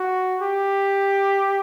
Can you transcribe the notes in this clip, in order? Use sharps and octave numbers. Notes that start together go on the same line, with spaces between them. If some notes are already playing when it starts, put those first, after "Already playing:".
Already playing: F#4
G4